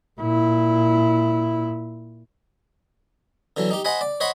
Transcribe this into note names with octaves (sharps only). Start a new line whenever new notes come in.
A#2 E4
D3 E3 F#3
D#4 G4
C5 D#5 F#5 G#5 B5
D5
C5 C#5 D#5 F#5 B5 C6